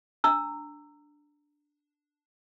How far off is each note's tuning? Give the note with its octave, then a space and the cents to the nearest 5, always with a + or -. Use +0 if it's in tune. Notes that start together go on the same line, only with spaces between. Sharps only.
D4 +0 A#5 -20 E6 +10